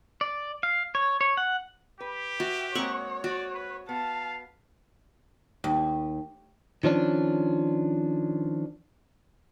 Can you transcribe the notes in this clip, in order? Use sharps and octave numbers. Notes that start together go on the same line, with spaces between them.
D5
F5
C#5
C#5
F#5
G4 B4
F#4 E5
G#3 A#3 C4 C#5 F#5 C#6
F#4 D5
B4
B3 F5 A5
D#2
D#3 F3 C#4 D4